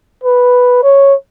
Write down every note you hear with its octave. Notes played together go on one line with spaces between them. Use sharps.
B4
C#5